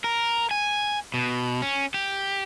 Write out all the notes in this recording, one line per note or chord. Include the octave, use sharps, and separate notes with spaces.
A#4
G#5
B2
C#4
G4